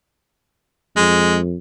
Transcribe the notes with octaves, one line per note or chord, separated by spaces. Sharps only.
F2 G#3